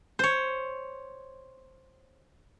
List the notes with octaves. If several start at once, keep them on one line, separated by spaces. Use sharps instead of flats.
C5 C#5